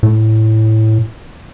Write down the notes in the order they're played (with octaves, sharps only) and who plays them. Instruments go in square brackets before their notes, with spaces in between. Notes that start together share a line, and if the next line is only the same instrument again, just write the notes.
[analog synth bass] A2